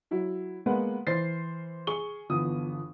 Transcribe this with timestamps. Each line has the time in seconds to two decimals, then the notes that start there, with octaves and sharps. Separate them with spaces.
0.11 F#3 E4 F#4
0.66 G#3 A#3 B3 B4 F#5
1.07 E3 C5 A6 C7
1.87 G#4 C#6 G7
2.29 G1 E3 F3 B3 D#6